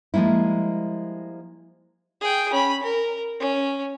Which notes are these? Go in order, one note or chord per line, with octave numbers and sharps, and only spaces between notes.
F3 G3 G#3 A#3 E4
G#4 G5
C#4 B5
A#4
C#4